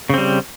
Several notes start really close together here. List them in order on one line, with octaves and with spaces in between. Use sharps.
C#3 C4 G3